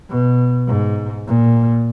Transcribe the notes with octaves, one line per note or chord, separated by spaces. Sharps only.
B2
G#2
A#2